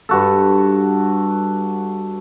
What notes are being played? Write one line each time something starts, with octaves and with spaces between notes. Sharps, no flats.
G2 F#4 A4